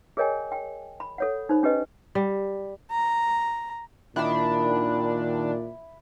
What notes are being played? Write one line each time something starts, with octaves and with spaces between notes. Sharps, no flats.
G#4 A#4 C#5 D#5 G5 G#5
G5
B5
A4 C#5 F#5
D#4 C5 B5
C#4 G4 B4 D#5
G3
A#5
A#2 D#3 D4 E4 B5